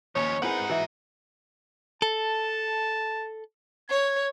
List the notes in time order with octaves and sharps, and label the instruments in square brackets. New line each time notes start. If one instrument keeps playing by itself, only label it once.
[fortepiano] D#2 [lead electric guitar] F3 C#4 [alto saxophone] C#5
[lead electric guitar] G#3 D#4 [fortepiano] C4 E4 G#4 [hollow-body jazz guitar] A#4 B4 [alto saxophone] F#5
[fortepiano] E3 [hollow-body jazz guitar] F#4 E5
[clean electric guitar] A4 [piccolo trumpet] A5
[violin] C#5 [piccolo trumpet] G#6